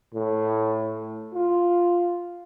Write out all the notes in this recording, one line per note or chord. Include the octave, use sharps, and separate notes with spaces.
A2
F4